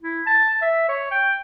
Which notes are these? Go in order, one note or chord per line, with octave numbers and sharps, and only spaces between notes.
E4
A5
E5
C#5
G5